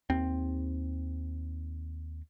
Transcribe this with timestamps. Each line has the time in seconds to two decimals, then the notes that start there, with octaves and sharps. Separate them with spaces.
0.10 D#2 C4